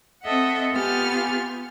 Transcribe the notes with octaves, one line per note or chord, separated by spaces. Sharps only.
C4 A4 D#5 E5 F#5
B3 F4 G4 G#5 F6